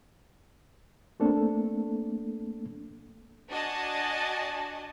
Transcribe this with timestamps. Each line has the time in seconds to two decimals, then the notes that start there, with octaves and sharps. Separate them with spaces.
1.20 A3 A#3 C4 D4 A4
3.49 D4 F#4 D#5 G#5 A5